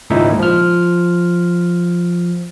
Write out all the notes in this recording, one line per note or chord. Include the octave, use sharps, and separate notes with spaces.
G#1 C#2 A#2 D#4 E4 E5
F3 F6